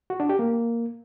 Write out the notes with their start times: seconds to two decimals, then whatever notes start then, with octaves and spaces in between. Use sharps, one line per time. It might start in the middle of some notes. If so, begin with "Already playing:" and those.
0.10 F#4
0.20 D4
0.29 G4
0.39 A#3